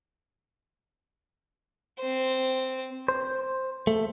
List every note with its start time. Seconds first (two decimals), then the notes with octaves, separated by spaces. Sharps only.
1.99 C4 C5
3.08 C5
3.87 A3